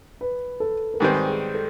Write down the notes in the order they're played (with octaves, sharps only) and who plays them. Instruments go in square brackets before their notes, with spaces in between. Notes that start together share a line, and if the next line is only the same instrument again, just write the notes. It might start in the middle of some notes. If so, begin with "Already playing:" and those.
[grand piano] B4
A4
A#4
[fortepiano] G#2 D#3 G3 C4 [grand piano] B4
[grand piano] G#4
A4